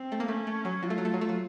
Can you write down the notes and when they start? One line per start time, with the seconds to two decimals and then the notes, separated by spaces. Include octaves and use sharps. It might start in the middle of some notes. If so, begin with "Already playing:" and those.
Already playing: C4
0.12 A3
0.20 A#3
0.28 A3 C#4
0.47 A3
0.65 F#3
0.83 F#3 F4
0.90 A3
0.98 F#3
1.05 A3
1.14 F#3
1.21 A3
1.29 F#3